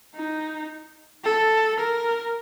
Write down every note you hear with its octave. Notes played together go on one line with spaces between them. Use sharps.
D#4
A4
A#4